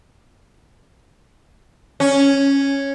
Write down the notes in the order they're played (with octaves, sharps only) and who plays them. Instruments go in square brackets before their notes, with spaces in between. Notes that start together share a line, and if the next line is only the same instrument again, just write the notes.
[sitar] C#4